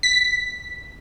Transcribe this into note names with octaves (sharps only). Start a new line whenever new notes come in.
B6